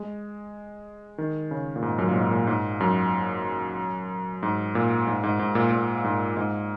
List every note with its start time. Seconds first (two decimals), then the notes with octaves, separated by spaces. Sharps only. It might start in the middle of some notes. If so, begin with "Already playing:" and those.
Already playing: G#3
1.18 D#3
1.51 C#3
1.76 A#2
1.82 G#2
1.98 F#2
2.08 A#2
2.16 G#2
2.31 A#2
2.47 G#2
2.80 F#2
4.43 G#2
4.75 A#2
5.07 G#2
5.24 G#2
5.39 G#2
5.55 A#2
5.72 A#2
6.04 G#2
6.37 G#2